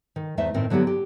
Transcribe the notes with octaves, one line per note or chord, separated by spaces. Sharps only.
D#3
E2 A3 D#4 C5 E5
A2 D#3 C4 A#4
D3 F#3 B3 D#4 G4
G4